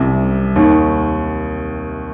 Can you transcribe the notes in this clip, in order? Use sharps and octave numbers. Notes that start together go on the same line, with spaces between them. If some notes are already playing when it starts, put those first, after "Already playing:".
Already playing: C2 C3
D#2 D#3